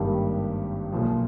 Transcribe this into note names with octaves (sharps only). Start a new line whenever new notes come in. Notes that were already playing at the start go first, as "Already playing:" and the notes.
Already playing: G#1 G2 D#3 G3 A#3 G4
B1 A#2 F3